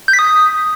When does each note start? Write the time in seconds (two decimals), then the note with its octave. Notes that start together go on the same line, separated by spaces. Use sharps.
0.08 G6
0.13 B6
0.19 D#6